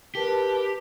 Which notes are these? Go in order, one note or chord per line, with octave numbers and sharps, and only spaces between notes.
G4 A#4 B4 A5